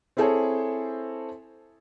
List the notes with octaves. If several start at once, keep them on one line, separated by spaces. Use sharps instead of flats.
C4 E4 G#4 A4 C5 C#5